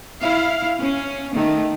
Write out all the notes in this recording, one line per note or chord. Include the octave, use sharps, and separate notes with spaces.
E4 F5
C#4
D#3 A3